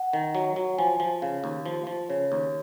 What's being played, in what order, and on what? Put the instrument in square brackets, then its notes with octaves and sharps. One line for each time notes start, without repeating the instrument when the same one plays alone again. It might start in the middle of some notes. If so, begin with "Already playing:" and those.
Already playing: [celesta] F#5
[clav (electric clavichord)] D#3
F#3
F#3
[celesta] F#5
[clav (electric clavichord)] F3 [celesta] G#5
[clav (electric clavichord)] F3
[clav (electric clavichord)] C#3 [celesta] F5
[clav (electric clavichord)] D#2
F3
F3
[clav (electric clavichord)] C#3 [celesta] C#5
[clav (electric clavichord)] D#2